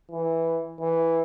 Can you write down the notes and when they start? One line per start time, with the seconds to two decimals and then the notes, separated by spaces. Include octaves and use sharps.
0.12 E3
0.80 E3